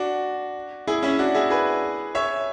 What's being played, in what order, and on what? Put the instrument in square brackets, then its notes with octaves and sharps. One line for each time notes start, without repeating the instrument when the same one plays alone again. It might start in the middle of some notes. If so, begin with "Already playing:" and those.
Already playing: [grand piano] D4 F#4
E4 G#4
C#4 E4
D4 F#4
E4 G#4
G#4 B4
C#5 E5